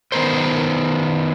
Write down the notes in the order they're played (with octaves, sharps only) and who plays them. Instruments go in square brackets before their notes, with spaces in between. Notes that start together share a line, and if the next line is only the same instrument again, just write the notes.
[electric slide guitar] D#3 B3 A#4 C5